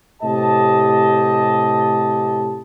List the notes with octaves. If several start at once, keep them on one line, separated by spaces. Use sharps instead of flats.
A2 C3 G4 D#5 A5